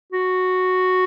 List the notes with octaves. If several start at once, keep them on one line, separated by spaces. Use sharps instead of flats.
F#4